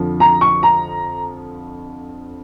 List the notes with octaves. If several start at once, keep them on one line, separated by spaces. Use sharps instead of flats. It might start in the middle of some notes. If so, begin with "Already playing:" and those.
Already playing: F2 D3 F3
A#5
C#6
A#5